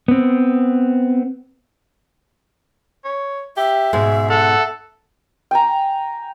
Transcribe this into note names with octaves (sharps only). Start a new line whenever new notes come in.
B3 C4
C#5
G4 E5
G#2 B2 G#3 G#4
A4 F#5
G5 G#5 A#5